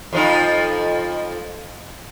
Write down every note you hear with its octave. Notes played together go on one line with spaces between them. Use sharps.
F2 F3 D#4